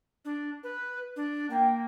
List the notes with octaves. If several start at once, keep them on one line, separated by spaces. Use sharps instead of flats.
D4
B4
D4
A#3 G5